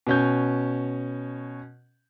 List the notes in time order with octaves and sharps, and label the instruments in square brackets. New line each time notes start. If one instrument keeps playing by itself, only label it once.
[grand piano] B2 C#4 G6